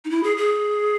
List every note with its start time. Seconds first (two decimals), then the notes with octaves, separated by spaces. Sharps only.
0.05 D#4
0.10 E4
0.23 G#4
0.37 G#4